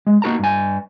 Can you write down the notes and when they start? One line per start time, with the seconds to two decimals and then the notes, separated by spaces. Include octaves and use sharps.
0.07 G#3
0.22 A#3 D#4 F#4 A#4 A5 A#5
0.39 G2 G#5